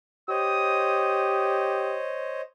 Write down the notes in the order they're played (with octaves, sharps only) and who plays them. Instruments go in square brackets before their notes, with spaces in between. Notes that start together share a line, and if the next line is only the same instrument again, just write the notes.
[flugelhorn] G4 [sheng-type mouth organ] C5 C#5 D#5 [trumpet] D#6